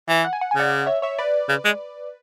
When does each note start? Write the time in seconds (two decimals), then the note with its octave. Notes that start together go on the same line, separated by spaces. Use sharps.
0.09 E3
0.24 F#5
0.33 G#5
0.41 F#5
0.51 G#5
0.56 C#3 D5 F#5
0.86 C#5 E5
1.02 C#5 E5
1.19 B4 D5
1.49 C#3
1.65 G#3